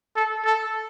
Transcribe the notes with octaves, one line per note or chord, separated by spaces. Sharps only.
A4
A4